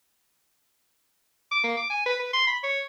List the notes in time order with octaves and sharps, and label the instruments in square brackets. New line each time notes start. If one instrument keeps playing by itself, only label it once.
[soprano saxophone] D6
A#3
D6
G#5
B4
B4
C6
B5
C#5